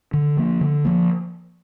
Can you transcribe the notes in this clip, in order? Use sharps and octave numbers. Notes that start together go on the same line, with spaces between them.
D3
F3 A#3
D3
F3 A#3